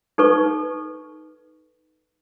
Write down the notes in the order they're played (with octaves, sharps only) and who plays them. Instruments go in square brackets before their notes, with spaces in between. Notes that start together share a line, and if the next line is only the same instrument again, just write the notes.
[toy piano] D#4 A4 B4 C#6